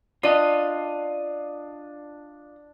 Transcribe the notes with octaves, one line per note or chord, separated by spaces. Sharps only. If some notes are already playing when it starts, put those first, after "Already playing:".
D4 F4 D#5